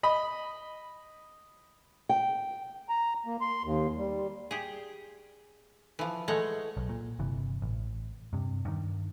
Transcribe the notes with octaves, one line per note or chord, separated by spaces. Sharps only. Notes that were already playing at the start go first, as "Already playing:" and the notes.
D#5 B5
G5
A#5
A#3
C6
D#2
G3
G4 G#4
E3 F3
G#3 A3 C#5 F#5
B1
A#2
G1 C3 E3
A1
G2 C3
G2 D#3